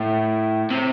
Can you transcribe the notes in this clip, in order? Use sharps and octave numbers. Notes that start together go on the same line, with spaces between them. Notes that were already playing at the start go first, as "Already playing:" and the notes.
Already playing: A2
C3